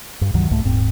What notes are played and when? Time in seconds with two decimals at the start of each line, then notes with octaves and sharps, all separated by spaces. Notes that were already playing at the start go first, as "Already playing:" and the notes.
0.21 G2
0.34 C#2 G2 D#3 F#3
0.51 C2 G#2 A3
0.65 D#1 G#2 C4